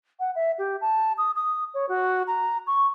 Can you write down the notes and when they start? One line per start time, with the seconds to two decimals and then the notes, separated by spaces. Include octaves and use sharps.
0.20 F#5
0.35 E5
0.58 G4
0.81 A5
1.18 D#6
1.35 D#6
1.74 C#5
1.89 F#4
2.27 A#5
2.67 C#6